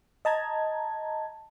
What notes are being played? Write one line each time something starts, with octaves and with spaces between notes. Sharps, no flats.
D#5 A5 A#5 G#6